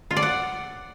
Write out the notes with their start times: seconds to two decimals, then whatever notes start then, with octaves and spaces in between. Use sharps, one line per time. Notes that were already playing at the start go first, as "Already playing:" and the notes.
0.11 F4
0.17 D5
0.22 F#5